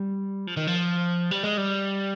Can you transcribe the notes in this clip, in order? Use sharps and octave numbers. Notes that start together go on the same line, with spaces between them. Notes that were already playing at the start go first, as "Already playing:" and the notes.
Already playing: G3
F3
D#3
F3
G3
G#3
G3